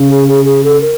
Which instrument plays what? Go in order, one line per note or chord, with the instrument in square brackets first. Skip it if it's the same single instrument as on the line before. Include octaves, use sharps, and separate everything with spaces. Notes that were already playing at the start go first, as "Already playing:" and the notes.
Already playing: [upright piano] C#3
[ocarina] G#4
G#4
G#4
A4
A#4